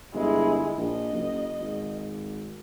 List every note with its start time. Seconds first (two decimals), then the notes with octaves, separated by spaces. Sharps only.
0.14 G1 G#3 E4
0.78 A#1 D#5
1.13 F#1
1.60 G#1